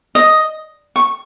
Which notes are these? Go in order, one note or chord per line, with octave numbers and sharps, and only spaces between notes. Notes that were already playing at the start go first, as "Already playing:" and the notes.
D#5
C#6